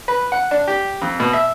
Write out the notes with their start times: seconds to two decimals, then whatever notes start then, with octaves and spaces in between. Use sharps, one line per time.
0.08 B4
0.32 F#5
0.51 D4
0.68 G4
1.02 F2
1.20 B2
1.33 E5